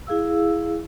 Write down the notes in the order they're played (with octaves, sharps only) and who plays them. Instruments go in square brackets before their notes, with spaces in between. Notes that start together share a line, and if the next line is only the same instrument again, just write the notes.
[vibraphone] E4 G#4 F5 E6